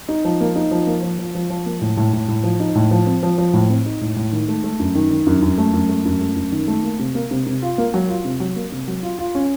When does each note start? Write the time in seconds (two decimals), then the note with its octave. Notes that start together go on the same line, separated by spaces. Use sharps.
0.09 D#4
0.25 F3
0.41 A#3
0.56 D#4
0.71 F3
0.87 A#3
1.03 F3
1.19 F3
1.35 F3
1.50 F3
1.66 A#3
1.81 A2
1.97 A2
2.13 A2
2.28 A2
2.44 F3
2.60 D#4
2.75 A2
2.91 F3
3.07 C4
3.23 F3
3.38 F3
3.53 A2
3.70 C4
3.86 D#4
4.01 A2
4.17 A2
4.32 D#3
4.49 A3
4.64 A3
4.79 F#2
4.95 D#3
5.11 D#3
5.26 F#2
5.42 F#2
5.58 A3
5.73 F#2
5.89 A3
6.05 F#2
6.21 A3
6.36 F#2
6.52 D#3
6.68 A3
6.83 A#3
6.99 C3
7.15 A#3
7.31 C3
7.46 C3
7.62 F4
7.78 A#3
7.94 F#3
8.09 F4
8.25 C3
8.40 F#3
8.56 A#3
8.72 C3
8.88 F#3
9.03 F4
9.18 F4
9.35 C#4